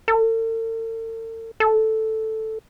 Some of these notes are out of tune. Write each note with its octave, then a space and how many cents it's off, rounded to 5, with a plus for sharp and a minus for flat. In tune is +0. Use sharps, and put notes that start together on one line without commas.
A4 +45
A4 +0